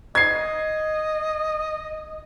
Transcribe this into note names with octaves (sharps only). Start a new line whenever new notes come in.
D#5 G#6 C7